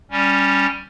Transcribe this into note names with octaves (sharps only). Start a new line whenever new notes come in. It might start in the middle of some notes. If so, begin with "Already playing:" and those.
G3 C#4